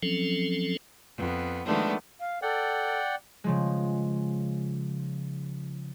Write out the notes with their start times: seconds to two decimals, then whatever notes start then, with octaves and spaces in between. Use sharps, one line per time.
0.03 F3 F#3 C4 C#4 A4
1.17 F2 B3
1.64 D#3 F3 G#3 A3 B3 D4
2.20 F5
2.42 A4 D5 F#5 G5
3.44 C#3 F3 G#3